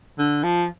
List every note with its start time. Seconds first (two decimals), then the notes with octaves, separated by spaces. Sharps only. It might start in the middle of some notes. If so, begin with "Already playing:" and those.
0.19 D3
0.44 F3